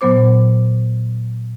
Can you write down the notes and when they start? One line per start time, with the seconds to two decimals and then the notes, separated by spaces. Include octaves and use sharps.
0.01 A#2 F#3 B3 C5 D6